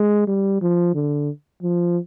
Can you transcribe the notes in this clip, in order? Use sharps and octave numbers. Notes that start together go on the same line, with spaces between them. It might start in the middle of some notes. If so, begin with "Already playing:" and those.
Already playing: G#3
G3
F3
D3
F3